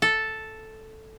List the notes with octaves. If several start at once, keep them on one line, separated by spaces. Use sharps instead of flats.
A4